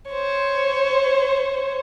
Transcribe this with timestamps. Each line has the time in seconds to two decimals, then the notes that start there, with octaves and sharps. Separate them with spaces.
0.10 C5 C#5